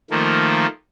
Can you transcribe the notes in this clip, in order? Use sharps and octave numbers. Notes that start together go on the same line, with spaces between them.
D#3 F3 A3 A#3